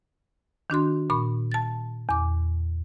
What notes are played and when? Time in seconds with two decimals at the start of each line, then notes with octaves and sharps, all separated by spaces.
0.70 D#3 D4 F#4 C6
1.10 A#2 B5 C#6
1.52 A5 A6
2.09 E2 D6